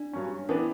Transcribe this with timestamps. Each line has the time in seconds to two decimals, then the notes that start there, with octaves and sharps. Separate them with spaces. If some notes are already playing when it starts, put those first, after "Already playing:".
Already playing: D4
0.13 G2 F#3 C#4
0.49 E3 B3 C#4 D4